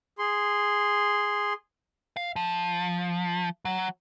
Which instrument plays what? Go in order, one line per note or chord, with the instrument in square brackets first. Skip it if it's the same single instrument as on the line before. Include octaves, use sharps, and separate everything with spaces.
[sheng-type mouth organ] G#4 C6
[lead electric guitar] F5
F3
F#3